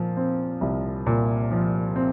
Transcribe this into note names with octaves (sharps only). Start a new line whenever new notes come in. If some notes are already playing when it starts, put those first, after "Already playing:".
Already playing: A#2 F3
C4
C2
A#2
F3
C4